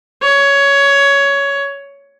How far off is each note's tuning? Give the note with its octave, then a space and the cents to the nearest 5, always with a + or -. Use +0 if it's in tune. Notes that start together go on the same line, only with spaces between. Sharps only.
C#5 +15